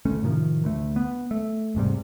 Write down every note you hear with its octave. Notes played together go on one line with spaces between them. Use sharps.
E1 D2 A3 C#4
A2 C3 D#3 F3
D2 A3
B3
A3
E1 G#2 C3 G3